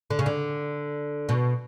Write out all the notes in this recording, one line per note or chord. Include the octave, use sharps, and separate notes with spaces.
D3
C#3
D3
B2